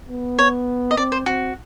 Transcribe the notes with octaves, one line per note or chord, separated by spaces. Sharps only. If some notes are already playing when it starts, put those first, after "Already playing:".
B3
C#5
D#5
C4 D5
C5
C4 F#4